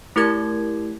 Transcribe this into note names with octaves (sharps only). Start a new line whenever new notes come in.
A3 E4 G4 A#4 D6 G#6